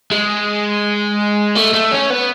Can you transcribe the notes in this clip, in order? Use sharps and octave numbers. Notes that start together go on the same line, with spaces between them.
G#3
A3
A3
C#4
B3